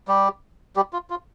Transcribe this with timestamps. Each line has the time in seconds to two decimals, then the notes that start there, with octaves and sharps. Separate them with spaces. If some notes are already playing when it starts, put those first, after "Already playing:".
0.08 G3 G4
0.76 G3 G4
0.93 F4
1.10 F4